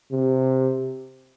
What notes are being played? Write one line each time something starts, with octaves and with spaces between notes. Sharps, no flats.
C3